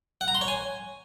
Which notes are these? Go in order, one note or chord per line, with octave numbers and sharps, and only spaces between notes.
F#5
A#5
C6
C#5
G#5